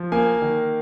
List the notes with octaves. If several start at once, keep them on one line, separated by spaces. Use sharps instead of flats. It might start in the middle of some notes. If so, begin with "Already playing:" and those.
Already playing: F3
A#3 G#5
D#3